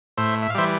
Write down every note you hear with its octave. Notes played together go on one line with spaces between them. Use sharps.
A2 C5 E5
E5
F5
E3 G3 C5 E5